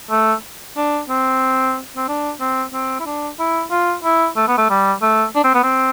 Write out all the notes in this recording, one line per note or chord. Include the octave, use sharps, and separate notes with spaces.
A3
D4
C4
C4
D4
C4
C4
E4
D4
E4
F4
E4
A3
B3
A3
G3
A3
D4
C4
B3
C4